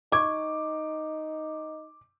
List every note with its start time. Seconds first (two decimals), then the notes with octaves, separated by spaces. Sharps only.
0.12 D#4 C#6 D6 G#6